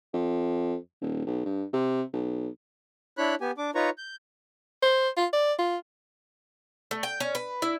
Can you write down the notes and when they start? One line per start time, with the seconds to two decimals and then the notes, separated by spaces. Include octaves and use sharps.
0.14 F2
1.01 D#1
1.26 B1
1.45 G2
1.73 C3
2.13 B1
3.17 D4 E4 C#5 B5 F#6
3.41 B3 G4 G#5
3.58 D4 D6
3.75 D#4 F4 B4 C#5 A#5 C#6
3.98 G6
4.83 C5
5.17 F4
5.33 D5
5.59 F4
6.91 A3
7.03 G5
7.20 C#4
7.35 B4
7.62 E4